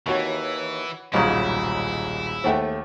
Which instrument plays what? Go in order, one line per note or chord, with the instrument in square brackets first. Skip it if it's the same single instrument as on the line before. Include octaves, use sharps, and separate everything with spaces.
[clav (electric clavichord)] D#2 [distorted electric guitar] E3 [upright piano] F#4 C#5
[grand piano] D#1 B1 A#5 [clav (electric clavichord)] G#2 C#3 [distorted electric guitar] E4
[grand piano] D#2 A3 [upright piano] C5 F#5 G5